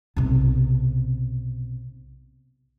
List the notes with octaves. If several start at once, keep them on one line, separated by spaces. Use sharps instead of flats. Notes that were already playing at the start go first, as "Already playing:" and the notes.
B1 C3